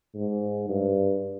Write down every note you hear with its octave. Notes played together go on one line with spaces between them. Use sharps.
G#2
G2